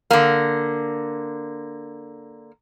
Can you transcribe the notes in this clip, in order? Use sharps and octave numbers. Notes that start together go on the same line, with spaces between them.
D3 A#3